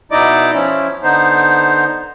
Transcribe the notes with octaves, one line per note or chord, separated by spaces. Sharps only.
B2 D#4 E4 D5 D#5 D6
F3 C#4 E4
D3 B3 D#4 C5